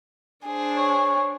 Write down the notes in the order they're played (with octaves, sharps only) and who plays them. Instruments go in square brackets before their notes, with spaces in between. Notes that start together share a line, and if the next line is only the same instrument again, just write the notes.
[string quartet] D4 G#4 C5
[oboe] C#5